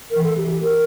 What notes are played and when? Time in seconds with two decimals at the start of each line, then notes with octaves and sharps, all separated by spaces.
0.11 E3 A#4
0.23 A4
0.37 G4
0.50 G4
0.62 A#4